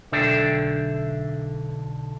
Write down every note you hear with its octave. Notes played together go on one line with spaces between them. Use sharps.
B1 D3 D4 A4 E5 G5